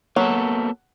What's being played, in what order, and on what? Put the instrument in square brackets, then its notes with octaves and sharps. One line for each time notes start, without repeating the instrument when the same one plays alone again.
[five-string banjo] F#3 [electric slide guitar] A#3 B3 A4